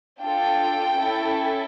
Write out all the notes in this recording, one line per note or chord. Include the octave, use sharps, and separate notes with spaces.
D4 F4 A4 G5
C#4 E4 A4